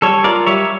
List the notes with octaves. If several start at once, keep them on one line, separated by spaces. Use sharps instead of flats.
G3 A4 C#5
F4 A#4 D5
G3 C#5 E5